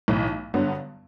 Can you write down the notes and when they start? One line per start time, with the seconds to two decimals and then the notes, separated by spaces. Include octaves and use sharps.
0.08 B1 A2 E3
0.54 G2 D3 F#3 B3